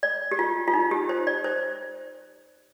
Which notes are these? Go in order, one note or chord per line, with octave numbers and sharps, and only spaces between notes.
D5
G4
F4
F4
D#4
G4
C5
D5
C5